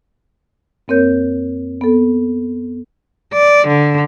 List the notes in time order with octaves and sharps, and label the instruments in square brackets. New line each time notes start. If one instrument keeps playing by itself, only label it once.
[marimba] F#2 A#3 C4 A#4 C#5 G6
B3 A4
[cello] D5
D3